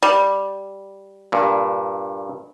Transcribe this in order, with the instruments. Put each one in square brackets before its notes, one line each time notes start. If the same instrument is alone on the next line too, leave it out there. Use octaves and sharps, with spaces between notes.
[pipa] G3
[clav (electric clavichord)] G2 A#2